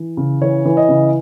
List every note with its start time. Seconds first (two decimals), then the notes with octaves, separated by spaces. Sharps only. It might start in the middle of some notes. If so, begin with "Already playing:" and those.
Already playing: E3
0.17 C#3
0.41 E3 C#5
0.65 E3
0.77 D#5
0.88 C#3